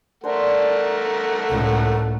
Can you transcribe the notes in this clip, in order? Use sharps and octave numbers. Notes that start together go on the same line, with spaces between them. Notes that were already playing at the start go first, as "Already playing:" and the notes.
A3 D4 A#4 C5 F#5
C#2 A2